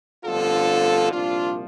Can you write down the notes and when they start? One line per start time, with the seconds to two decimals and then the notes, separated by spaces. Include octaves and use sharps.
0.24 G1 F2 D3 F3 F4 A4
1.12 C2 A#2 F3 D4 F4